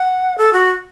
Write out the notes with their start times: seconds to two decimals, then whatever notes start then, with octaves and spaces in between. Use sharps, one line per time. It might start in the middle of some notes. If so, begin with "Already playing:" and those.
Already playing: F#5
0.38 A4
0.53 F#4